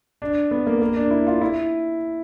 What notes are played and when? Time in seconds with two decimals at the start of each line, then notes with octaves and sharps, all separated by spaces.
0.22 D4
0.51 B3
0.67 A#3
0.82 A#3
0.96 D4
1.11 E4
1.27 F4
1.41 E4